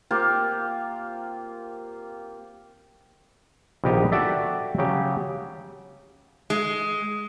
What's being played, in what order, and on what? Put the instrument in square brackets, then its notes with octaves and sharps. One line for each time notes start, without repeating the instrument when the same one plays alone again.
[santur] A#3 C4 F4 G4
[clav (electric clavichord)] A#1 D#3 B3 G4 D#5 A#5
F#4 G4 A4 D5 E5
C#3 F#3 G4
[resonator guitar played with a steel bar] G#3